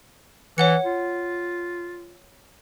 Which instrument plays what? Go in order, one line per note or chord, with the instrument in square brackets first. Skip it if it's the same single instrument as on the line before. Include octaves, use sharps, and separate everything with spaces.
[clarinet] E3 [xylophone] C#5 F#5 C#7
[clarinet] F4